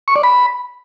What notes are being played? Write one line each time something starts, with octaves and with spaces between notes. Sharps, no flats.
C#6
D5
B5